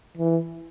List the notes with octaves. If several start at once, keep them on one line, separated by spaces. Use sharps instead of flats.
E3